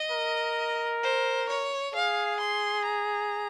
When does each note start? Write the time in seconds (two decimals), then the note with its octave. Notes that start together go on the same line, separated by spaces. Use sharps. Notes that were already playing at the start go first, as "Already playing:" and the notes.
Already playing: D#5
0.11 A#4
1.03 C5
1.49 C#5
1.95 G#4 F5
2.40 C6
2.86 A#5